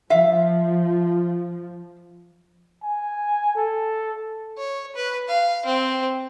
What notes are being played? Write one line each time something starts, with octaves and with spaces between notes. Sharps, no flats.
F3 E5 F5
G#5
A4
C#5
B4
F5
C4